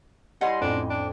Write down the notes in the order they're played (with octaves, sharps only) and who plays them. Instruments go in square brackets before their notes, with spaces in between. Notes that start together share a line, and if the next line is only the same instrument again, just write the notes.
[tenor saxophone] G3 [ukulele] E4 C#5 F#5 [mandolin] D#5 G#5 C6
[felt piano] A1 F2 [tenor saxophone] D4
[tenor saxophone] D4